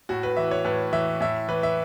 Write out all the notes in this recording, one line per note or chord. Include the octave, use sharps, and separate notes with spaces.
A2 F#4
B4
E3 E5
C#5
A2 B4
E3 E5
A2 E5
E3 B4
E5